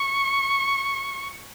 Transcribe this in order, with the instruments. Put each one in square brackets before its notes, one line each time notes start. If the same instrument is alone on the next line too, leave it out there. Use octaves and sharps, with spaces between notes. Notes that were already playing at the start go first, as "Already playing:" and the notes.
Already playing: [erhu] C#6